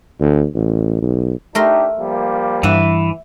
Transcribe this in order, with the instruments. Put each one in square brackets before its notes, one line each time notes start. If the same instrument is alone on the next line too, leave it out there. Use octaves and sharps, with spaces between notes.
[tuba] D2
A1
B1
[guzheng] A3 A#4 C6 [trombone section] D4 D#4 G4
[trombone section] F3 G3 A#3
[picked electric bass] G2 [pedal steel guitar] E3 [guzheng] E5 F#5